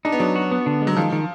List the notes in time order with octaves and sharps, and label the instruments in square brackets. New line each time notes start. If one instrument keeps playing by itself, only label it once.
[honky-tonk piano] D4 [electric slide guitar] D#4
[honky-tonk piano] B3
[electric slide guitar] F#3 [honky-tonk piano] D4
[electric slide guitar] F#4
B3
D3
G#3
[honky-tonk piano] F#3
[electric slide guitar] D#3 [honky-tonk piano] F3
[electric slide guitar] D#3